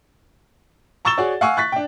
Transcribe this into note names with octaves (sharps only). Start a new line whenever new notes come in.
A#5 C#6 E6 A6 E7 G7
F#4 G#4 C#5 D5
F5 F#5 G#5 C#6 E6
C#6 F#6 A6 B6
D4 G5